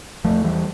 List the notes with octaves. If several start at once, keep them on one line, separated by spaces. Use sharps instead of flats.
E2 F3 A3
E3 G3